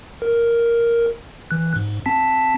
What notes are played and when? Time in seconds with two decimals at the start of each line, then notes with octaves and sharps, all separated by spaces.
0.22 A#4
1.51 E3 F#6
1.76 G#2
2.06 C4 A5 B6